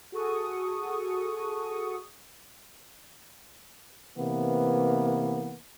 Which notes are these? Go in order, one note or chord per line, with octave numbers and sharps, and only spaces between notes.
F#4 G#4 A4 C#6 D#6
C3 E3 A#3 B3